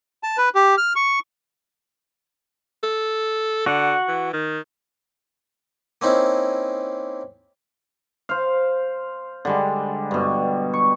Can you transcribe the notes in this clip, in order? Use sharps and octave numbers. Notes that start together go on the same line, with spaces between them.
A5
B4
G4
F6
C#6
A4
D3 F#4 F#5
E3
D#3
A#3 C4 C#4 D#4 E4
C5 F5
D3 G3 G#3
G2 B2
C#6